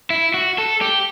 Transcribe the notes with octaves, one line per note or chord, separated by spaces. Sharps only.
E4
F#4
A4
G4